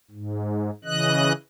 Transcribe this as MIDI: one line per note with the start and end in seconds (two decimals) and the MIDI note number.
0.11 0.70 44
0.84 1.33 49
0.84 1.33 52
0.84 1.33 75
0.84 1.33 90